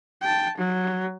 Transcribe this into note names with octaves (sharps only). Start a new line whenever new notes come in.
G5 A5
F#3